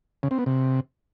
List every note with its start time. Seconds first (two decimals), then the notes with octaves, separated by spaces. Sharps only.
0.23 C#3
0.31 C4
0.39 B3
0.46 C3